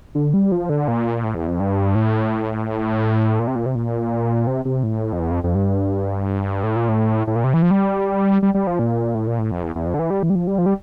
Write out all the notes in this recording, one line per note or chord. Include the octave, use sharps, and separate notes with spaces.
D3
G3
F3
D3
A#2
A2
E2
F2
G2
A2
A#2
C3
A#2
C3
A#2
C3
C3
A2
F2
E2
F2
F2
G2
A2
A#2
A2
A2
A#2
C3
E3
F3
G3
G3
G3
F3
A#2
A2
A#2
A2
F2
E2
E2
F2
D3
E3
G3
E3
G3
F3
G3
F3
G3